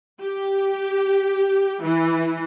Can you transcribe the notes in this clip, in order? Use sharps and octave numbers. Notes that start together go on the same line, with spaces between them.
G4
E3